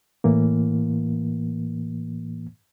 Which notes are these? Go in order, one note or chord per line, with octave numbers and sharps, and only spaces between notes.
A2 E3 A#3